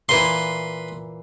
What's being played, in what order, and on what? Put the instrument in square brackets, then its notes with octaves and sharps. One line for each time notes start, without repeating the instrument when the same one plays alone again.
[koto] A#2 E3 [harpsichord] B4 C6